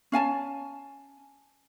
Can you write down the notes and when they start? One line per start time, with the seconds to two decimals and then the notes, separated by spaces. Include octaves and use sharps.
0.12 C#4 F5 G#5 A5